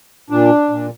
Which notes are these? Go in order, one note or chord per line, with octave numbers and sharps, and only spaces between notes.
A#2 D4
A#2